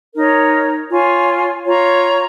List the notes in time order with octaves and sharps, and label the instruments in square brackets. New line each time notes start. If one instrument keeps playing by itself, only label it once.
[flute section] D#4 A#4 C#5
F4 C#5 G#5 C#6
F4 C#5 A#5 C#6